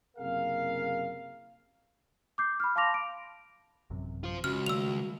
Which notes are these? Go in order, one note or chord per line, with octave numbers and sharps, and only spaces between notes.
F#1 C3 G#4 A#4 F5
D6 G6 C7
B5 F6
F5 A5 C6 D6 A#6 F7
D7
A1 F#2 C3
F4 C5
C#2 C#4 F#4 F6
D#3 G3 A3 E6 F7